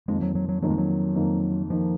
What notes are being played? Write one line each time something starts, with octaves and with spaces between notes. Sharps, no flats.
F2 D#3 G#3 A#3
F#3
F#3
F#3
F2 D#3 F#3 A#3
G#3
F#3
F2 D#3 A#3
D#3 F3 A#3